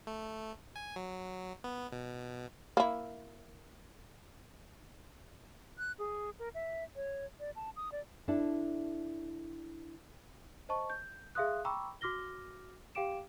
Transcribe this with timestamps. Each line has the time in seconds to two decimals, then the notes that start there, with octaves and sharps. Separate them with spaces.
0.07 A3
0.76 G#5
0.96 F#3
1.64 B3
1.92 B2
2.77 A#3 E4
5.78 F#6
5.99 G#4
6.39 A#4
6.54 E5
6.96 C#5
7.40 D5
7.56 A5
7.76 D#6
7.92 D5
8.28 D4 E4 A4
10.69 C5 D#5 A5 C#6
10.90 G6
11.35 G#4 E5 F5 C6 D#6 F#6
11.65 G5 A#5 B5 C#6 D6 E6
12.01 F#4 D6 F6 A#6 G7
12.95 G4 F5 G5 D6 D7 E7